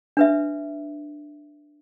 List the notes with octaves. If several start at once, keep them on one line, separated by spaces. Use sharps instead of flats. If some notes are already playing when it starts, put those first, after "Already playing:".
D4 B4 E5